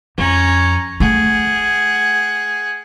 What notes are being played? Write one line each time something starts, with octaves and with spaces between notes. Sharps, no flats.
F2 C#4 A#5
A3 G#4 F#5